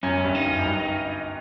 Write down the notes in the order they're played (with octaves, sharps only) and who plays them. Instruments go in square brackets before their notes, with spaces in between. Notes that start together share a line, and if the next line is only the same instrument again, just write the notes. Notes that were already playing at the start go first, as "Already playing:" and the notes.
[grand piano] F#2 [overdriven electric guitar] C#4
[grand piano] F#2
G2
[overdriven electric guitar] D#4
[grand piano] F#2
F#2
G2